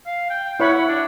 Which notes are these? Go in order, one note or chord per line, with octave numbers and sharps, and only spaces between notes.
F5
G5
E4 C#5 F#5 B5
D4